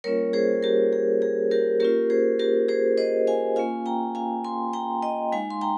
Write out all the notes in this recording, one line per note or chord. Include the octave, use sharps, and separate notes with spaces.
G3 A#3 C#4 F4 A#4 C#5
G#4 C5
G4 A#4
G#4
G#4
G4 A#4
A#3 C#4 F4 G4 A#4
G#4 C5
G4 A#4
G#4 C5
C5 D#5
F5 G#5
A#3 C#4 F4 F5 G#5
G5 A#5
F5 G#5
G#5 C6
G5 A#5
D#5 G5
G#3 D#4 F5 G#5
C6
G5 A#5